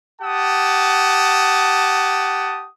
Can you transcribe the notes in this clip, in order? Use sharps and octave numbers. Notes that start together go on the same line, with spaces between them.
G4 F#5 A5 D#6